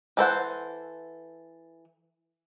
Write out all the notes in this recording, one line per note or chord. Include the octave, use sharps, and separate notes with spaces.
E3 A4 C5 F#5